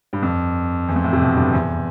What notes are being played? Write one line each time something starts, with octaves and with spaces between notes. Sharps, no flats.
G2
F2
E2
F2
A2
C3
B2
G2
E2